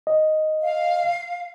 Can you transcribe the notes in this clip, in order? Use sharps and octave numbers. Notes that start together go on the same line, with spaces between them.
D#5
F5